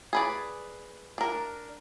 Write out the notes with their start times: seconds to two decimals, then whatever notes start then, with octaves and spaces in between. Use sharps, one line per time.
0.13 G#4 B4 D5
1.18 D4 A#4